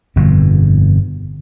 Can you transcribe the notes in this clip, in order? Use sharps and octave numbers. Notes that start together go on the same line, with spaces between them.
G1 F2 B2